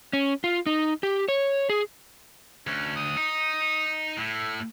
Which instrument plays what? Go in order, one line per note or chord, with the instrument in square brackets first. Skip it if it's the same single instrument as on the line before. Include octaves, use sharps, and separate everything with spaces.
[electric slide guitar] C#4
F4
D#4
G4
C#5
G#4
[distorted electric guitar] D2 [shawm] C#4
[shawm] D#6
[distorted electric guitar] D#4
[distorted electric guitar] A2 [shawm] E4